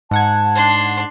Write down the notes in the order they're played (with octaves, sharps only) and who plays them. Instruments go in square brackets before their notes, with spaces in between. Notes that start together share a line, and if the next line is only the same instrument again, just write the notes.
[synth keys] G#2 F#5 G#6 [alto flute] A5
[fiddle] D4 C6